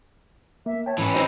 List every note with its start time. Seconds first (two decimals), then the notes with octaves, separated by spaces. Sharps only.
0.66 A#3 E5
0.86 C#5 G5 A5
0.98 G#2 E3 C#4 B5
1.14 C4 D#4 F#4